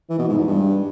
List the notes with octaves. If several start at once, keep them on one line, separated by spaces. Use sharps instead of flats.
E3
B2
G#2
E2
G2